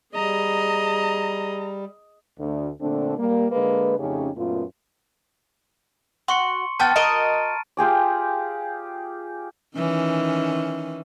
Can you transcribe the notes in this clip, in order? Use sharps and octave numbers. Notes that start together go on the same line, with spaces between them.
G3 G#4 D#5 A#5
D2 D3
A#2 D3 A3 C4 D4
G3 A#3
D3 G#3 A#3 B4
F2 C#3 A3 C#4 D#4 G4
F#2 A#2 A3 B3 F4
F#4 C6 C#6 C#7
B3 G5 A5 F6 G6 A6
F#4 A#4 D#5 A#5 D7 D#7
F4 G4 G#4 D5
D#3 E3 C#4